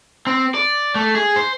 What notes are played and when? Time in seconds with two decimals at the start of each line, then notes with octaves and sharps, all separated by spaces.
0.27 C4
0.55 D5
0.95 A3
1.15 G#4
1.36 C5